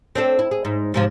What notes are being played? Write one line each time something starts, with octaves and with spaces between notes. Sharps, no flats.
C4 D4 A4
E4
G#4
G#2
G#2 C3 F3